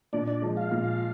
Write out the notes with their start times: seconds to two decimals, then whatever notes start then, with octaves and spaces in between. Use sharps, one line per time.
0.13 A#2 D4 D5
0.27 D4 D5
0.42 F3 G#3
0.57 F4 F5
0.71 A#2